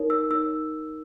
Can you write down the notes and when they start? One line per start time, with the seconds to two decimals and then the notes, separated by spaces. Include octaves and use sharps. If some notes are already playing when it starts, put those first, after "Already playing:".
Already playing: D#4 A#4 C#5
0.10 E6
0.31 D#4 A#4 C#5 E6